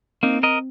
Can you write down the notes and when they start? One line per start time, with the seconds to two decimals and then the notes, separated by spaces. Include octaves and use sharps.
0.23 A#3 C4 D#4
0.43 A#4 D#5